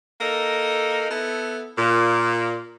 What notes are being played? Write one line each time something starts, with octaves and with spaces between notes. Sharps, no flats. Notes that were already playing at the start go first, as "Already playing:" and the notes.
A#3 D#4 A4 A#4
B3 E4 A4
A#2